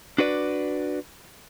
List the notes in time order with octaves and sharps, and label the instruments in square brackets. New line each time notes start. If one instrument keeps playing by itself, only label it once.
[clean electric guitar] D4 F#4 B4 D5